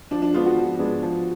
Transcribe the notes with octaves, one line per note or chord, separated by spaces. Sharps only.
F3 D4
D4
G#3 B3 D4 F4
F#4
F3
G#3 B3 D4
F3